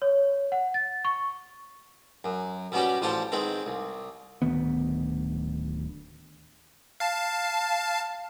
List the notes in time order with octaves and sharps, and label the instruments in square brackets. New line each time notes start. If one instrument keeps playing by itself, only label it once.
[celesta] C#5
F#5
A6
C#6
[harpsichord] F#2
B2 G3 B3 C#4 F#4 G4
A1 F3 G3 F4 C5 A5
D#3 G#3 B3 C4
C2
[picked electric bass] D1 D2 D#3 B3
[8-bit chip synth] F5 A5